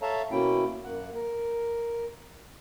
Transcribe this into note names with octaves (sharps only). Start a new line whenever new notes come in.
A4 C#5 E5 F5 A5 A#5
B2 A#3 C#4 E4 G5
F#2 A#3 F#5
A#4